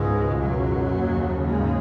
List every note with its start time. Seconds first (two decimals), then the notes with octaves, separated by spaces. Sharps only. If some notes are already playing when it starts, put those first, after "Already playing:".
Already playing: C#2 G#2 B2 G#3
0.43 F#2 F#3
0.96 D#2 C#3
1.50 G#2 G#3